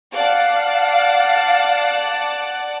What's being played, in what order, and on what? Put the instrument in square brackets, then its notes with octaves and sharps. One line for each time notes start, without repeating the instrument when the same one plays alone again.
[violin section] D5 F#5 A5 [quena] F5